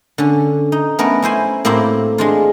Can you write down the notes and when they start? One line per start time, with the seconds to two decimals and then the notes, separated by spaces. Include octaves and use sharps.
0.18 D3 C#4
0.72 D#4
0.99 A3 B3 C#4 A#4 B4
1.22 C#4 E4 C5 G#5
1.65 A2 A#3 C4 E4 G4 B5
2.18 G#3 D4 F4